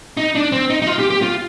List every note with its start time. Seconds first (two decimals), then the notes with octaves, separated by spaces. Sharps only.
0.17 D#4
0.35 D4
0.52 C4
0.70 D#4
0.82 D#4
0.87 F4
0.99 G4
1.10 G4
1.22 F4